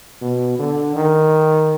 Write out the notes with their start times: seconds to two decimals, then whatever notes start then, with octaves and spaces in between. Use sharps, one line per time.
0.21 B2
0.59 D3
0.95 D#3